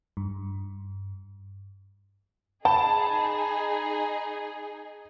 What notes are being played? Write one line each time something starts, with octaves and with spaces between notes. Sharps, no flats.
G2
D#4 G#4 G5 A5 B5